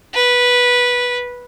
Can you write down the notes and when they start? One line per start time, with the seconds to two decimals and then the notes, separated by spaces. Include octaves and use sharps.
0.14 B4